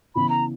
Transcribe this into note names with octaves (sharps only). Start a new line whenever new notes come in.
C#3 E3 B3 E4 B5
A#5